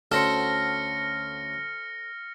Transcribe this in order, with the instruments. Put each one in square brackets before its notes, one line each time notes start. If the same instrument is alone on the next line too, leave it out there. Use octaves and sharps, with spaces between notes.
[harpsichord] D2 C#4 F#5 [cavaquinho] A4 C5 [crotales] F6 A#6 C#7